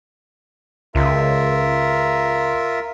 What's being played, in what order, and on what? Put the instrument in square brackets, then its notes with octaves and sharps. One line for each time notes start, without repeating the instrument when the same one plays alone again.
[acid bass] C#2 [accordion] F4 A#4 E5